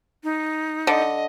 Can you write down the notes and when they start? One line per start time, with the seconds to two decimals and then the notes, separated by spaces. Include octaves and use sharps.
0.24 D#4
0.87 D3 D#5